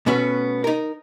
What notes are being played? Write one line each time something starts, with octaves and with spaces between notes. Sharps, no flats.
B2 A3 B3 C#4 F#4
D#4 A#4